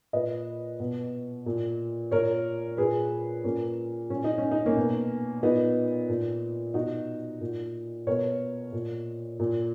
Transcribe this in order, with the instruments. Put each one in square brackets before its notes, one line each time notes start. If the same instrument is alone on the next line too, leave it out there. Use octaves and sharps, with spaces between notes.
[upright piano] A#2 B4 D#5
B2
A#2
A#2 A#4 C#5
A#2 G#4 B4
A#2 A#3 C#4
A#2 C#4
D#4
C#4
D#4
A#3 C#4
B2
A#2 B3 D#4
A#2
B2 D#4 F#4
A#2
B2 A#4 C#5
A#2
A#2